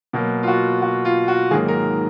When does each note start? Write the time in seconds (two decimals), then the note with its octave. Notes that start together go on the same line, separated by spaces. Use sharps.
0.13 B2 F#3 A#3
0.43 F4
0.47 F#4
0.82 F#4
1.05 F4
1.28 F#4
1.51 G#2 D#3 F#3 A#3 G#4
1.68 A#4